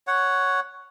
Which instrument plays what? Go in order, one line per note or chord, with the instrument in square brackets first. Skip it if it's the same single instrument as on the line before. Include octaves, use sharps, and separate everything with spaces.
[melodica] C#5 F#5